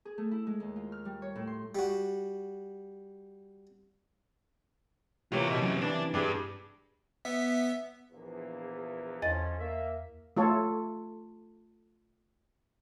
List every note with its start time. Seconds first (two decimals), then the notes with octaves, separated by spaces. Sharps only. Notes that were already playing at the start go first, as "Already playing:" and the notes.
0.05 G#4
0.18 A3
0.31 E4
0.47 G#3
0.60 D#2
0.76 F4
0.92 F6
1.05 G3
1.22 C#5
1.36 A2
1.47 C6
1.75 G3 F#4
5.32 C3 E3 A#3 F4 C#5
5.48 F#4 D#5
5.61 C#3 F#3
5.81 E3 D4
6.14 G2 G3 D4 G#4 B4
7.25 B3 E5 B6
8.11 A#1 E2 A#3
9.22 E2 D3 F3 C#4 D#5 A6
9.60 A#3 E5
10.37 A3 F4 A4 C#5